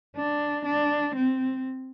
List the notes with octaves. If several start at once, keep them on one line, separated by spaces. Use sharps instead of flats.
D4
D4
C4